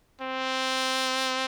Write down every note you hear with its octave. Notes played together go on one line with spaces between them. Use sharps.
C4